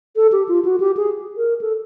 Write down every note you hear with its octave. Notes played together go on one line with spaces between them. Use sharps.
A4
G4
F4
F#4
G4
G#4
A#4
A4